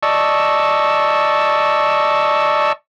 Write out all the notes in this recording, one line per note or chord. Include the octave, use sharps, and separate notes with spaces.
D5 D#5 A5 C#6 E6